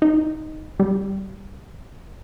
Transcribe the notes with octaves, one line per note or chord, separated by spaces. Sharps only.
D#4
G3